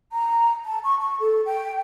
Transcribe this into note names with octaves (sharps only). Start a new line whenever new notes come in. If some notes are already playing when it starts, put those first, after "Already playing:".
A#5
A5
C#6
C#6
A4
G5